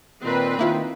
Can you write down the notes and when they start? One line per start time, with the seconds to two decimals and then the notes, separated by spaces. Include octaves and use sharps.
0.22 A#2 D#3 C4 B4
0.59 D#3 A#3 E4 F4